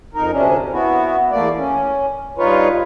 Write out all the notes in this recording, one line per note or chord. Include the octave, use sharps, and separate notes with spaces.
F2 D#4 A#4
D2 C3 C#4 D4
B3 E4 F#4
E2 A3 A#3 D5
C#4
G2 D#4 F4 B4 C#5